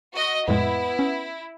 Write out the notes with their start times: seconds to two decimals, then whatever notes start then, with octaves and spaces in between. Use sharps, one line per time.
0.15 F#4 D#5
0.48 F2 A2 G#3 B3 E4
0.99 C#4